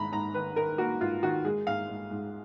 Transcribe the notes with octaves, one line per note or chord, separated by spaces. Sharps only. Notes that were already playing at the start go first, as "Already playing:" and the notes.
Already playing: G#2 D#3 A#5 B5
G#2 A#5
D#3 B4
D#3 A#4
A#3 F#4
G#2 F4
D#3 F#4
G#3 G#4
G#2 F5
G#2
G#2